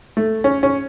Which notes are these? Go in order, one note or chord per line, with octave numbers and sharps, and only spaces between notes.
A3
C#4
C#4